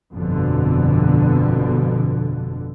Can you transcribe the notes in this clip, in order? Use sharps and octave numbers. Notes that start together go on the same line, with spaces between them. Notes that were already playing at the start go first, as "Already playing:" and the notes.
G1 F2 B2 D3